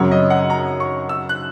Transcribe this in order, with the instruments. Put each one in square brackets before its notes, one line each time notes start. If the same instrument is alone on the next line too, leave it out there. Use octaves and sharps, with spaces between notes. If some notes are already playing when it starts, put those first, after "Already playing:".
Already playing: [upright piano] F#2 C#3 F#3 [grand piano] C#5
[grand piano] D#5
F#5
A#5
C#6
E6
F#6